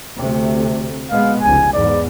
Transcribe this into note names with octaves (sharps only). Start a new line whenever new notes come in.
D2 C3 A3
B2 G#3 B3 F5
F1 C#2 G#5
B1 E2 G#2 D5